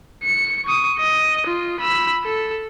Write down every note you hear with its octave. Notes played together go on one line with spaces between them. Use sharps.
C#7
C#6 D#6
D#5
F4
B5 E6
A4